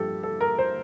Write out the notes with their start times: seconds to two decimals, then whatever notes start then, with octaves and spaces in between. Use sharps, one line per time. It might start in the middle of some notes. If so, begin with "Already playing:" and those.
Already playing: G2 F3 G4 A4
0.23 A4
0.41 A#4
0.58 C5